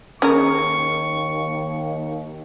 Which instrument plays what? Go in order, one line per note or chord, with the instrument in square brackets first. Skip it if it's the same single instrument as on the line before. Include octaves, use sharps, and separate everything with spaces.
[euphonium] D#2 [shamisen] C#4 G#4 A#4 [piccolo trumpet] C#6